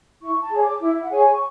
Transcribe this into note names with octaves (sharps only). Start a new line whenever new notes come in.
E4 C#6
A5
G#4 C#5
D6
E4
E5
F#5
G#4 C#5 G#5
C#6